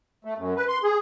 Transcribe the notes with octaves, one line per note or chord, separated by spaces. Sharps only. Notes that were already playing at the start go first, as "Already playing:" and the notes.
A3
F#2
B4
C6
G#4